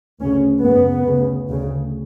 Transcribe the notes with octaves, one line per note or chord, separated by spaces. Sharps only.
D2 C#3 C#4
F#2 C#3 B3
D2 C#3
D2 C#3